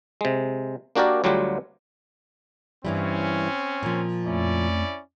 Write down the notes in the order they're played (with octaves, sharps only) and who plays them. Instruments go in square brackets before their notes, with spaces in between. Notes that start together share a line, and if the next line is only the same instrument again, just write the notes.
[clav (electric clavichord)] C3 G#3
A#3 D4 F#4 G4 A#4 D5
D2 F#3 G3 F4 G4 F#5
[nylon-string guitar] G2 E3 G3 [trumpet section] C4 C#4
[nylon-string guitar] A#2 F3
[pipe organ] F2 A3 [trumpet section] C#4 E4 D5